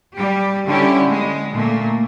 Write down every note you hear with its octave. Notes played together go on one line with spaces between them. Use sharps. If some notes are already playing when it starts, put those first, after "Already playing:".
G3 G4
D3 G3 C#4 E4 G4
G#3
A#2 A3 A#3